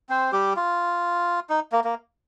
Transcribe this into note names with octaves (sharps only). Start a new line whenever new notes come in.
C4 C5
G3 G4
F4
D#4
A#3
A#3